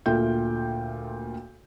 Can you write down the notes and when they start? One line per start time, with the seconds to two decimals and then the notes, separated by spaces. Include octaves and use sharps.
0.06 D2 A#2 A3 F4 G5 G6